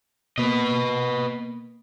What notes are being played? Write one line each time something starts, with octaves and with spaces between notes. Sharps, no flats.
B2 A#3 B4 D#5